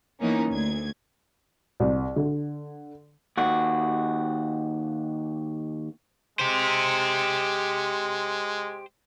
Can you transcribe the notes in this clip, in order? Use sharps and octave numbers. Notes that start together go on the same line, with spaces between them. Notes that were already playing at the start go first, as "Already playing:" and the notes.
E3 A#3 B3 C#4 D#4
D2 G#6
C2
D3
D#2 F#4
G#3 G4 C5